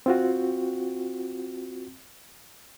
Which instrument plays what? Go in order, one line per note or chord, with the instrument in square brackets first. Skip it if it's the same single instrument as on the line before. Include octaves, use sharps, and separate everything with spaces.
[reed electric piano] C4 F4 F#4